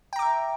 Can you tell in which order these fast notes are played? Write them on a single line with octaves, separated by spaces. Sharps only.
G5 A#5 D6 E5